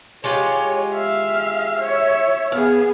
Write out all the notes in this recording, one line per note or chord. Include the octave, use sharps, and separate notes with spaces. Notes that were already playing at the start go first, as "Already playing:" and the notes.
G#3 F4 G4 C#5
E5 F5
C#5 E5
B3 G#4 F5